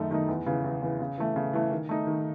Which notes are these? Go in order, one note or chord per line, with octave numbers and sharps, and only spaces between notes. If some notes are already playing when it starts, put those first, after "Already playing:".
Already playing: F#2 D#3 A3 D#4
D#3 A3 D#4
E2
C#3 E3 B3
E2
C#3 E3 B3
C#3
E3 A3
C#3
E3 A3
D#3
A3 D#4
D#3